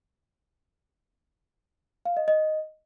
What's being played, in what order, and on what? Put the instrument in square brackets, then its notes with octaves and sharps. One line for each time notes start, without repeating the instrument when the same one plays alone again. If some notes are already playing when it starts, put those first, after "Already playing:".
[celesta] F5
D#5
D#5